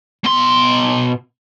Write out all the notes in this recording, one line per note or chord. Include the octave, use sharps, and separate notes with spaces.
B2 C6